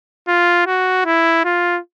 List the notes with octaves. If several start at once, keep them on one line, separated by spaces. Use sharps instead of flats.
F4
F#4
E4
F4